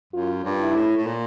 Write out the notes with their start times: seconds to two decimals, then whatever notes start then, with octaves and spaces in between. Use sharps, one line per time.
0.13 F#2 F4
0.44 G2
0.61 E4
0.75 A2
0.97 A2
1.06 A#2